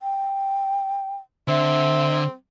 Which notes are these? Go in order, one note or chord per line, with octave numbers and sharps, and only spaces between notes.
G5
D3 C4 E5